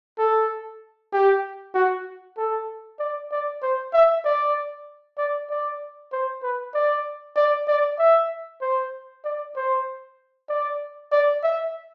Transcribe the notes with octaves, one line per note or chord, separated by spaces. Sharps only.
A4
G4
F#4
A4
D5
D5
C5
E5
D5
D5
D5
C5
B4
D5
D5
D5
E5
C5
D5
C5
D5
D5
E5